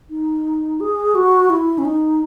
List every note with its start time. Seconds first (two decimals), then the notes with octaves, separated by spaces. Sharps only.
0.10 D#4
0.80 G#4
1.15 F#4
1.50 E4
1.78 C#4
1.85 D#4